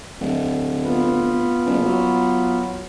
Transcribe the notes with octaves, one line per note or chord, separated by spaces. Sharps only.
D1
B3 F4 B4
F#1
F#3